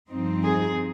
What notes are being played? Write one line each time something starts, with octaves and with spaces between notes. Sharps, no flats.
G2 F3 C4 D#4
G#4